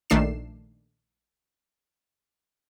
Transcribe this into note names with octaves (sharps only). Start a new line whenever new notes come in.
A#1 D#3 A3 D4 C7 E7